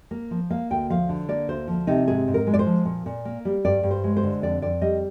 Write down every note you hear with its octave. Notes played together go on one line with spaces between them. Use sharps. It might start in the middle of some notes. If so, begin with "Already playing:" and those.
A#3
F3
A#3 F5
D2 G5
F3 F5
D3
A#3 D5
D2 C5
F3
C3 D#4
G#2 G#4
G#2
A#4
G#3
D5
C5
F3
A#2
A#2
A#3
G3
G2 D5
G2
C5
G#3
C5
D3
F2 D5
F2 D5
G3 D#5